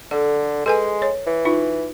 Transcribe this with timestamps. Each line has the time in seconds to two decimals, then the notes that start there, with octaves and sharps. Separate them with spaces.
0.11 D3 A4
0.66 G#3 A4 B4 G#5
1.02 C#5
1.27 E3
1.45 D#4 F4